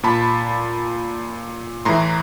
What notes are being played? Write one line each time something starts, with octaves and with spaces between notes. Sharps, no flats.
A#2 A5 B5
A2 E3 A#5 C6